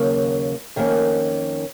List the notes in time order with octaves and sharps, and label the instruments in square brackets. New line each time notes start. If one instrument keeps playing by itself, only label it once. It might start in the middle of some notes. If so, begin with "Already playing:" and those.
Already playing: [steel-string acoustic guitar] D#2 C#3 F#3 A#3
F2 D#3 A#3 C#4